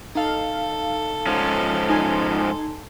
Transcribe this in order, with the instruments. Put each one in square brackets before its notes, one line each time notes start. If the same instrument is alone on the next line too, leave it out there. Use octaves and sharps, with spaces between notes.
[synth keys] D#4 F5 [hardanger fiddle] A4
[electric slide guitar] G#2 F3 C#4
[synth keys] D#4 G#5 C6